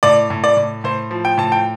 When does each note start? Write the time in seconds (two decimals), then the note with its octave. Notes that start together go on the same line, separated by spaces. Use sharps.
0.03 A2 D5
0.30 A2
0.44 D5
0.57 A2
0.84 A2 C5
1.11 F3
1.25 G5
1.38 A2 A5
1.52 G5